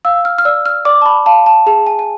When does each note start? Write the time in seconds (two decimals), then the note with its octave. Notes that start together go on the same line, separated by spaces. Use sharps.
0.05 F5 E6
0.25 F6
0.38 F6
0.45 D5 E6
0.66 F6
0.85 D5 D6
1.02 A5
1.06 B5
1.26 F5 A5
1.46 A5
1.67 G#4 A5
1.87 G#5
1.99 G#5